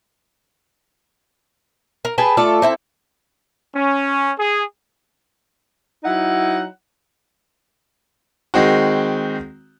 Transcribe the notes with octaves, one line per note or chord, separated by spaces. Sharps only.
A#4
G#4 B4 G5 A5
A3 F4 A4 D5
C4 E4 A4
C#4
G#4
F#3 D#4 E4 F#5
D#3 G#3 C4 F#4